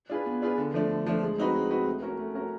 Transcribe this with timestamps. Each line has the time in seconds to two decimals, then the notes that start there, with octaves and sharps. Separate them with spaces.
0.09 D4 F4 G#4 B4
0.26 B3
0.42 D4 F4 G#4 B4
0.58 D3
0.74 F3 A3 D4
0.90 D3
1.06 F3 A3 D4
1.22 G#3
1.38 C4 D#4 F#4 B4
1.55 G#3
1.71 C4 D#4 F#4 B4
1.86 A3
2.02 C#4 F#4 A#4
2.18 A3
2.35 C#4 F#4 A#4